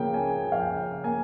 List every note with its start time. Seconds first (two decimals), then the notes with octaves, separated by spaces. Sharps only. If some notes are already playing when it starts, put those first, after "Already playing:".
Already playing: C#3 F3 A#3 G5
0.14 C#4 G#5
0.44 F3
0.52 F5
0.59 G5
0.74 C#3
1.04 A#3 G#5